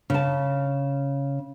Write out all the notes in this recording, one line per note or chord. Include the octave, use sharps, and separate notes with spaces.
C#3 A5